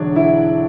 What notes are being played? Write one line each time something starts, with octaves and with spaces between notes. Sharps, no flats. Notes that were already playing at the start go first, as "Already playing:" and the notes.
Already playing: E1 E2 D3 F#3 D4 C#5 D5
E4 E5